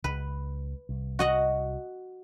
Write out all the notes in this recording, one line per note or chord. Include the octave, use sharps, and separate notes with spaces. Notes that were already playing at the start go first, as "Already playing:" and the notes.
C#2 B4
C2
F#4 D#5 F#5